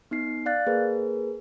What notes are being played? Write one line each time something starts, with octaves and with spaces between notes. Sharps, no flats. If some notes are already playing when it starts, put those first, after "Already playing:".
B3 D#4 C7
D5 F5 F#6 A6
A#3 G#4 A#4 B4